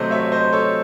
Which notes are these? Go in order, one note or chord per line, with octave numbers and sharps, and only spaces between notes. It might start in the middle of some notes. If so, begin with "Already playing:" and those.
Already playing: C3 F#3 A3 C5 D#5
C#5 E5
C5 D#5
A4 C#5